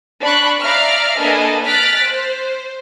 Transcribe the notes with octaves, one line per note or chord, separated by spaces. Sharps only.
D4 B5 C#6 F#6
D5 E5 F5 A#5 F6
A#3 D4 A4 B4 D#5 G#5
F6 F#6 A6 B6 D7
C5